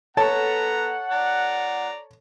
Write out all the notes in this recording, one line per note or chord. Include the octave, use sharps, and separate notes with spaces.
B3 A4 C#5 F#5 A5 A#5
D5 A#5